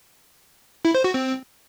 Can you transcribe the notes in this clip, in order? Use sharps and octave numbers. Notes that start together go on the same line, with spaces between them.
E4
C5
F#4
C4